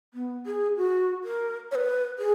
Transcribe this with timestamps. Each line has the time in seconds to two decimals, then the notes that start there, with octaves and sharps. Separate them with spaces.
0.14 B3
0.46 G#4
0.77 F#4
1.24 A#4
1.71 C#5
1.75 B4
2.19 G#4